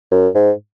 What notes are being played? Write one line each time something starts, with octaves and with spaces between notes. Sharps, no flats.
F#2
G#2